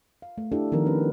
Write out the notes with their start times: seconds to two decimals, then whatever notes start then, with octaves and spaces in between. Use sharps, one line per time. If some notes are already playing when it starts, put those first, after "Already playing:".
0.22 F5
0.38 A3
0.52 D4 E4 G4 A4
0.72 D#3 F3 B3 A#4
0.86 C#4 F#4 B4